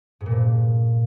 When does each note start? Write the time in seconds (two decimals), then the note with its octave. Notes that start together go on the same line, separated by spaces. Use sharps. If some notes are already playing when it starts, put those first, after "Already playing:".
0.21 G#2
0.26 A#2
0.31 G2